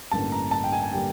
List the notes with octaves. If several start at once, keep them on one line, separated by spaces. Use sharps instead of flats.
A1 G2 D3 G3 A#3 A5
A#5
A5
G5
G#5
G#5
D3 G3 A#3 G5